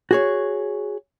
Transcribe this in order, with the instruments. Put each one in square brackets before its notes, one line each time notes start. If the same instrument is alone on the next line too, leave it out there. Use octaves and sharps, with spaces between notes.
[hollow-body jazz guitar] F#4 G#4 C#5